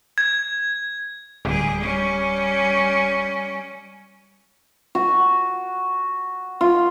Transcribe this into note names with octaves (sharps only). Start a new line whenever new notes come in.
G#6
D1 G3 G#4
G3 C#4
F#4
F4